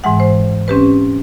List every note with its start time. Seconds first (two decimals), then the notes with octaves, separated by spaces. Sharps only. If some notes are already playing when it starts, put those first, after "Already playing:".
0.04 G#2 E3 G#3 F#5
0.20 C5
0.68 C4 C#4 G4 B4